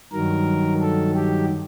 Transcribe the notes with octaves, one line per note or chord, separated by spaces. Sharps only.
G2 D#3 F#3 A#4
A4
G4